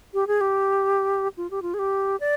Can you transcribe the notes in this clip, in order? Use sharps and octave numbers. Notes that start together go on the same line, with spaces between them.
G4
G#4
G4
F4
G4
F4
G#4
G4
D5